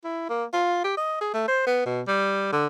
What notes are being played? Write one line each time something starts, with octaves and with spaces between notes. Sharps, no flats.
E4
A#3
F4
G4
D#5
G#4
A3
C5
B3
B2
G3
D3